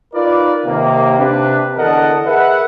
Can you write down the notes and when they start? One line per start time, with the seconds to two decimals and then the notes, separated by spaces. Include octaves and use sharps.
0.14 D#4 F4 A#4 B4 D5
0.66 D#2 C3 D#3 A#3
1.19 C3 D4 B4
1.77 E2 D3 A#4 D#5 F#5 A5
2.26 G#4 A#4 B4 E5 F#5